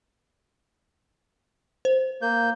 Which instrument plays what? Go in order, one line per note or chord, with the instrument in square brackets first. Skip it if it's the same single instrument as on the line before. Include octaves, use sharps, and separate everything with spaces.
[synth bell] C5
[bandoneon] A#3 G6